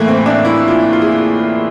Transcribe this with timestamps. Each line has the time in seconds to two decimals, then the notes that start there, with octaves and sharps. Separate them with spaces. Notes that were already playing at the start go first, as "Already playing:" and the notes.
Already playing: A2 E3 A3 A#3
0.08 C4
0.26 D4
0.45 E4
0.68 F4
0.93 F4
1.02 G#4